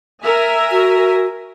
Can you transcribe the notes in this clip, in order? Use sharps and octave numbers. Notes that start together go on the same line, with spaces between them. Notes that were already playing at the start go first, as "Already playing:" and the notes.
A#4 E5 G#5
F#4